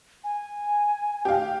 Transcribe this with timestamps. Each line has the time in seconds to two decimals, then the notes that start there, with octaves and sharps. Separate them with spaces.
0.24 G#5
1.25 G4 F5